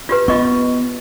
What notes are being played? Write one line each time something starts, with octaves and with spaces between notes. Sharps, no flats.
F4 G4 B4
B3 F4 D#5 C#6